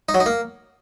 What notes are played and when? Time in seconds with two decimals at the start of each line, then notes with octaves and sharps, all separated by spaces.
0.09 D#4
0.14 F#3
0.20 D#4
0.26 A#3